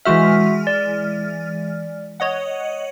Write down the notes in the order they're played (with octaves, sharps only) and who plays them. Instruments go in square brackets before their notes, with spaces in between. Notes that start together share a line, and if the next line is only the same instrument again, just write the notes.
[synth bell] E3 G#3 F6 [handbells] F#4 E5
[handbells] D5
[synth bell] C#5 D#5 F#5